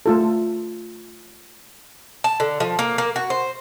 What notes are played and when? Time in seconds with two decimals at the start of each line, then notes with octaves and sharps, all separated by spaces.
0.06 A3 F4 A4
2.24 A5
2.40 D3
2.60 F3
2.79 A#3
2.98 A#3
3.16 F#4
3.30 C5